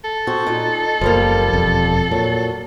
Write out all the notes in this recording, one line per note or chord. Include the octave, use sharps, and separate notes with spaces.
A4
C4 F#4 G#4
A#2 D#4
F#1 F3 G3 A#3
E1 F2
A#2 F#3